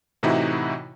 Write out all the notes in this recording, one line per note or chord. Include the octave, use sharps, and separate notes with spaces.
A2 C3 E3 D#4 E4 F#4